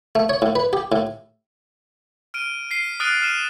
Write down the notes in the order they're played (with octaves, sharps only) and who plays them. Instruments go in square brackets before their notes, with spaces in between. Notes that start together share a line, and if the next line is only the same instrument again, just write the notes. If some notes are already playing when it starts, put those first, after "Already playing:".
[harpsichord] A3
C#5
A2
B4
G4
A2
[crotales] F6 D7 D#7
B6 C7 D#7
D#6 F6 F#6 A6 D7 D#7
F6 D#7 E7